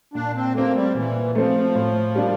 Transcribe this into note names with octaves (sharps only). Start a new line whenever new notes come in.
A#2 D4
C4
A3 A#3 C4
G3
A#2 E3
F3 A3 C4
A2
G3 A#3 D4